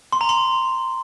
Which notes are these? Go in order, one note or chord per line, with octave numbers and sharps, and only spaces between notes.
C6
A#5
C6